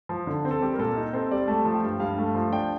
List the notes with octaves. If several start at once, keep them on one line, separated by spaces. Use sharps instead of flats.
F3
D3
C4
A4
G3 G4
A#4
A#2 A4
D#4
C4 A4
G3 D5
A3 A5
F3
G5
G2
G2 F5
A3
F3
D4 G5